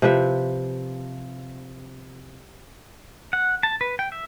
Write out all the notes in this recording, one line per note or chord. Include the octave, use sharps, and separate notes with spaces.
C3 F3 B4 E5
F#5
A5
B4
G5
E5